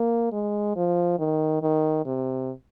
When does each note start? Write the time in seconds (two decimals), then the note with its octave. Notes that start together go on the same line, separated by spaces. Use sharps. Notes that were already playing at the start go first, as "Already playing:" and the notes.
Already playing: A#3
0.32 G#3
0.76 F3
1.19 D#3
1.62 D#3
2.06 C3